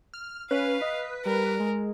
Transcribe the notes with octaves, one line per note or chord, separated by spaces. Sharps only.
F6
C#4 B4 F5
D#5
G3 A#4
G#3